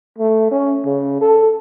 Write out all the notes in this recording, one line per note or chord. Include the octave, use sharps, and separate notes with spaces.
A3
C#4
C#3
A4